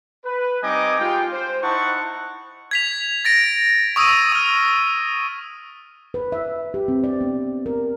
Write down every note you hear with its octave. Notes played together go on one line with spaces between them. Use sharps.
B4
G3 C4 D#4 D#5 G#5 D6
G#3 F4 G4 G5
C5
D#4 E4 C5 F#5 A5 C#6
G#6 B6 F7
A6 A#6 D7
C#6 D#6 E6 G#6 D#7
D#6 F6
B4
E5
G4
C4
D5
B3
A#4